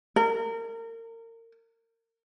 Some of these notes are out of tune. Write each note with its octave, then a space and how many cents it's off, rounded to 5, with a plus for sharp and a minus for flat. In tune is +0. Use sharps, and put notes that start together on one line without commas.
A#4 -30